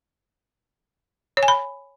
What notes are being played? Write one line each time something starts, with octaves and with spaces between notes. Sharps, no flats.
C#5
G#5
B5